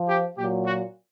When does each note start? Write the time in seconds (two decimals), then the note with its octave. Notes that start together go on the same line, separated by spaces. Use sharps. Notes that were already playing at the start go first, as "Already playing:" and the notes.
Already playing: F3
0.08 G4
0.37 A#2 F#3 G4
0.65 F#4